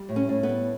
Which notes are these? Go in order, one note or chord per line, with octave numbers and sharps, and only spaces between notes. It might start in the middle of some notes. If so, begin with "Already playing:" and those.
Already playing: G3
A2
C#4
A2
B3
G3